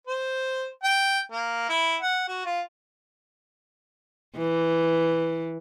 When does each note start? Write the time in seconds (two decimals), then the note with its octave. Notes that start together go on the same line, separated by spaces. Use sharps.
0.07 C5
0.83 G5
1.31 A#3
1.69 E4
2.01 F#5
2.28 F#4
2.45 F4
4.37 E3